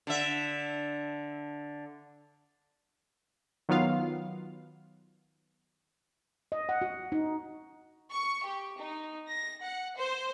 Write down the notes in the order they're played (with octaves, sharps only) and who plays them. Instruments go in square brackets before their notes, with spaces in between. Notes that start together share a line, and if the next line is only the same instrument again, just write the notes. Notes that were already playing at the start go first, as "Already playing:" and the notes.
[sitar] D3 E5
[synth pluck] D#3 F#3 B3 F4 F5
[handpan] D#5
F#5
F#4
D#4
[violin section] C#6
G4
D#4
A#6
F#5
C5